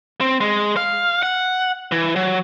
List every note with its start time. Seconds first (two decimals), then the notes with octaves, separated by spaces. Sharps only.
0.21 C4
0.41 G#3
0.77 F5
1.23 F#5
1.92 E3
2.16 F#3